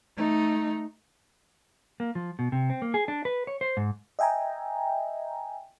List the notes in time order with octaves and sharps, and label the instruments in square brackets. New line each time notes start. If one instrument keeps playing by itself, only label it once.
[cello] A3 D#4
[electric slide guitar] A#3
F3
B2
C3
C4
A#3
G#4
D4
B4
C#5
C5
G#2
[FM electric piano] D#5 E5 G5 G#5 A#5